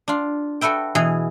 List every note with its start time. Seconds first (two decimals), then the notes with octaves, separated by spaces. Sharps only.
0.08 D4 F4
0.61 F#4 A4 B4 E5 G5
0.95 B2 E3 G#4